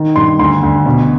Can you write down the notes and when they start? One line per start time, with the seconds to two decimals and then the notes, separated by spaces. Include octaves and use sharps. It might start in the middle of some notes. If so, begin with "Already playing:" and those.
Already playing: D#3
0.16 G2 C6
0.39 D2 C6
0.63 D2
0.86 B2